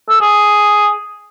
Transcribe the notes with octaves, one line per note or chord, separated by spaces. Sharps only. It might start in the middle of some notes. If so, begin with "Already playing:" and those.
A4
G#4